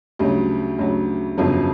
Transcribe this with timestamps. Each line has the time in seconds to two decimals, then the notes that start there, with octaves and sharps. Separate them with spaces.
0.19 D2 C#3 F#3 G3
0.78 D2 C#3 F#3
1.37 G1 F2 C#3 F#3